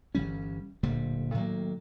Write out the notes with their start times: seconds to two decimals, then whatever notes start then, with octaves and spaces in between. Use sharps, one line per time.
0.15 G1 E3 G3 C#4
0.83 D1 A#2 D3 G3
1.34 A2 D#3 F#3 A#3